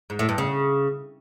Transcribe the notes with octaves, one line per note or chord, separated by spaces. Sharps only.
G#2
A2
G2
C#3